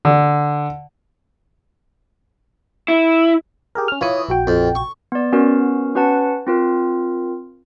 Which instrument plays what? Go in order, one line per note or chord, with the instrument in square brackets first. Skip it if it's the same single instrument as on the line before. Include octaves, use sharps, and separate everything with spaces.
[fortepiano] D3
[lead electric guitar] E4
[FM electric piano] G4 G#4 A#4
C#4 F6
[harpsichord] E3 [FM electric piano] F4 C#5 D#6
[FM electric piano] A#1 F#4 G5
[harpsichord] F2
C#6
[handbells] B3 D5
B3 C#4 F#4 A#4
C#4 F#4 B4 F#5 A5
C4 F4 A#4